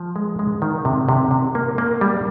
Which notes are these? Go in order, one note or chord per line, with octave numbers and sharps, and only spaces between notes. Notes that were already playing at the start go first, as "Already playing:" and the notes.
Already playing: F3
G#3
G#3
D#3
C3
C3
C3
A#3
A#3
G3